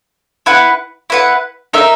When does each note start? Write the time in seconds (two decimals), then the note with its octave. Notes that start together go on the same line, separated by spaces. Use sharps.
0.46 E4 B4 F#5
1.10 E4 B4 F#5
1.73 D#4 A#4 E5